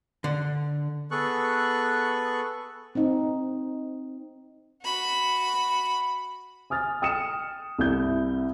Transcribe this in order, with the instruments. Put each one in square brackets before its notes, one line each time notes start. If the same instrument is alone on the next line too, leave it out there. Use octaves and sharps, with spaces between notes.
[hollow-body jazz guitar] D3
[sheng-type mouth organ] B3 G#4 A4 C#6 F#6
[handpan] C4 D#4
[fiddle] F#4 B5
[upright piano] G#5 D#6 F6 A6
G5 D#6 F6 C#7 E7
C2 E4 G6